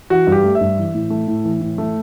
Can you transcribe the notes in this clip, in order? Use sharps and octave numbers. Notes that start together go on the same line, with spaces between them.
E3 F#4
G2
G4
A3
E5
G2
E3
A2
A3
A2
E3
A2
A3